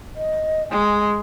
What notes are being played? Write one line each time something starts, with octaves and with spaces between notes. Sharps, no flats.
D#5
G#3 G#5